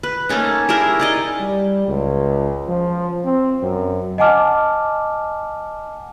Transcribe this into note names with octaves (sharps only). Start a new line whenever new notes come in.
B4
A3 A#3 C#4 D#4
E4 G4 G#4 A#4
D#4 D5 D#5
G3
C#2
F3
C4
F#2
D#5 F#5 G#5 A5 D6 F6